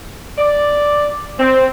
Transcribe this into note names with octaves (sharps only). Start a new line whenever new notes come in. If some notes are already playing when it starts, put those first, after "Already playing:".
D5
C4